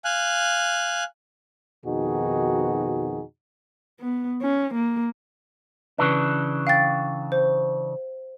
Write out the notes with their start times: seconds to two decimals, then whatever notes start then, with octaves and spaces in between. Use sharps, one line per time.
0.05 F5 G#5 F#6
1.85 F2 B2 D#3 D#4 F#4 G#4
4.00 B3
4.42 C#4
4.75 A#3
5.98 C#3 E3 D4 B4
6.67 F5 G5 A6
7.32 C5